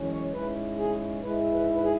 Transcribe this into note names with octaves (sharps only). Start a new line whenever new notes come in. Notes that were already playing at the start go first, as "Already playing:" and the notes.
Already playing: F#2 E3 G#3 C#4
C#5
G#2 G#3 C#4 E4 B4
G#4
G#2 G#3 E4 B4
B4
B4
G#4